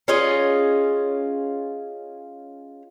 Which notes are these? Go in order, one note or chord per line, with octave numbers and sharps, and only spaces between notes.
C#4 F4 G#4 D#5